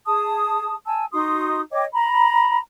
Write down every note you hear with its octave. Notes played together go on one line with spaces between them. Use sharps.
G#4 A5 D#6
G#5 A5 E6
D#4 F#4 C6 D#6
C#5 D#5 G5 D6
A#5 B5